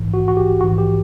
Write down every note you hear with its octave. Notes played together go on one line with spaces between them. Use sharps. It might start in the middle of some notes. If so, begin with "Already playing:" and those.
Already playing: A#1 G#2 E3
F#4
F#4
G4
A#1 G#2 E3 F#4
G4